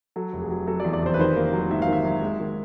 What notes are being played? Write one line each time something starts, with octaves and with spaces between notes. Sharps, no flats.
F#3 A4
F1
G#4
F#3
F#3 A4
D5
E2
D5
F1 C5
B4
D#3 C5
A#3
F#3
G#2 E5
F5
D#3
E5
F#3
G#3
D#3